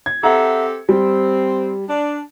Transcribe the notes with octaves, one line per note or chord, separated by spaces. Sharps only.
G#6
C4 G4 A4 E5 F#5 A#5
G3 C4
D4